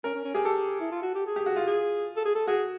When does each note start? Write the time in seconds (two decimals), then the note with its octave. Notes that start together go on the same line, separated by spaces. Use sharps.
0.04 C#4 A#4
0.15 C#4
0.25 C#4
0.35 G4 G#4
0.45 G4 A4
0.80 E4
0.92 F4
1.02 F#4
1.15 G4
1.26 G#4
1.36 G4
1.46 F#4
1.56 F4
1.67 G#4
2.16 A4
2.25 G#4
2.35 A4
2.47 F#4 G#4